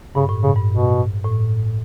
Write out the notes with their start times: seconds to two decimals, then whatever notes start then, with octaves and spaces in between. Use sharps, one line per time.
0.15 G2 C#3
0.29 A2
0.43 G2 C#3
0.56 G2
0.70 B2
1.25 A2